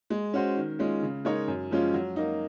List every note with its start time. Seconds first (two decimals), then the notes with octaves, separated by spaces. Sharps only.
0.10 G#3
0.34 C#4 F#4 C5
0.57 D#3
0.79 G#3 C#4 F4
1.03 C#3
1.25 G#3 D#4 A#4 C#5
1.48 F#2
1.71 F3 G#3 C#4 F4
1.94 F#3
2.16 A#3 D#4